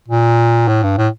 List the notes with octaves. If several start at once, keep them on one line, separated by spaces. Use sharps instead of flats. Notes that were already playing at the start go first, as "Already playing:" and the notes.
A#2
A2
G2
A2